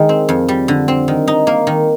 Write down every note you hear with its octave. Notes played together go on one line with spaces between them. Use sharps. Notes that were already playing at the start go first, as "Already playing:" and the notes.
Already playing: D#3 G#3
C4
F2
G3
D3
C4
D#3
D#4
A#3
D#3